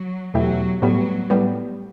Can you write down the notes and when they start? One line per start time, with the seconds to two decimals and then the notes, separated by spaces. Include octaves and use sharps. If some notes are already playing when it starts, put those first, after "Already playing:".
Already playing: F#3
0.34 E2 B2 F#3 A3 E4 G4
0.82 A2 F#3 G3 B3
1.30 A2 G3 B3